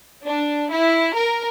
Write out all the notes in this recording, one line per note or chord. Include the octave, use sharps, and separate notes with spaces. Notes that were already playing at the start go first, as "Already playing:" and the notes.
D4
E4
A#4